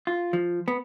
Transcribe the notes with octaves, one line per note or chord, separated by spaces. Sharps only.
F4
F3
B3